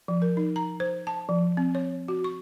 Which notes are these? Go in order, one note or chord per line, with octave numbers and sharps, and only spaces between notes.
F3
A#4
D#4
A#5
C5
A5
F3
C4
C#5
F#4
C#6